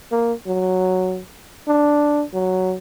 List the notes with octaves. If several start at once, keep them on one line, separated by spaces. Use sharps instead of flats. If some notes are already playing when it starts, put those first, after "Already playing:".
A#3
F#3
D4
F#3